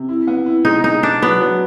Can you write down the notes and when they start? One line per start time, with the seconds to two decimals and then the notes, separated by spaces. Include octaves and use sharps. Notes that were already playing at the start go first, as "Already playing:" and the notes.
Already playing: C3
0.09 E4
0.27 B3
0.46 E4
0.65 G#3 D#4
0.84 G#3 D#4
1.03 B3 D4
1.22 F#3 B3
1.41 F#3